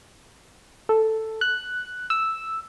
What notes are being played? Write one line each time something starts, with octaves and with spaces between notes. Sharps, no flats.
A4
F#6
E6